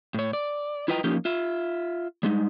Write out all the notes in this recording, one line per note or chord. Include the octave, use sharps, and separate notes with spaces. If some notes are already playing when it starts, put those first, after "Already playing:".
A2 C#5
D5
E4 F4 B4 D#5 G5 A#5
F3 A#3 C#4 D#4 F4 G4
F4 E5
G3 G#3 D#4